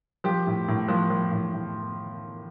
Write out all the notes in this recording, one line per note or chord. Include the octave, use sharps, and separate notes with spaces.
F3 G4
A2
A2
F3
F3
A2
A2